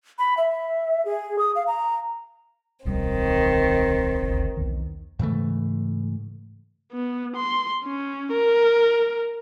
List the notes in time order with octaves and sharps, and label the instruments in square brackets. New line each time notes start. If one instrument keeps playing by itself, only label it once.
[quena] B5
E5
G#4
D#6
F5
A#5
[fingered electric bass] D1 B1 G3 [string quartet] D#3 C4
[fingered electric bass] D1 G1 C#2
B1 E2 D#3
[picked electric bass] G#2 C#3 E3 A3
[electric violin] B3
C6
C#4
A#4